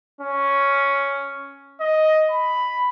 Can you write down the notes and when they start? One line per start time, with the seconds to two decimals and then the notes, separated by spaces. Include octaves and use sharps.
0.21 C#4
1.80 D#5
2.31 B5